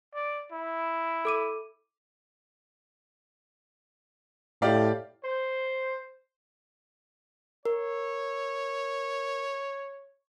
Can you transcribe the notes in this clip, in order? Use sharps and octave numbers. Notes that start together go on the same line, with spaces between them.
D5
E4
A4 D6 D#7
A2 G4 D5 F5
C5
A#4 C#5